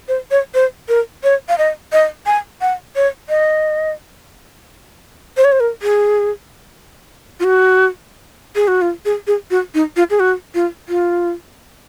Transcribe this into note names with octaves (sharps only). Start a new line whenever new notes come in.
C5
C#5
C5
A#4
C#5
F5
D#5
D#5
G#5
F#5
C#5
D#5
C5
C#5
C5
A#4
G#4
F4
F#4
G#4
F#4
F4
G#4
G#4
F#4
D#4
F4
G#4
F#4
F4
F4